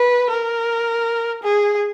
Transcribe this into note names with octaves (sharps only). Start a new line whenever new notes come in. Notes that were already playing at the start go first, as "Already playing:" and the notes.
Already playing: B4
A#4
G#4